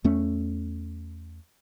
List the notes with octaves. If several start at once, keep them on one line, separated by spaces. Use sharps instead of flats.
E2 A3 C#4